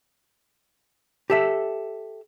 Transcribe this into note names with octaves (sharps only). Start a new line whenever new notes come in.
G4 A4 E5